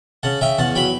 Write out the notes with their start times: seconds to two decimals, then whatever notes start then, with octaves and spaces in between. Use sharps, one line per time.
0.23 C#3 F#5 A5
0.41 C#3 E5 G5
0.59 E2 F#5 A5
0.75 F#3 G5 B5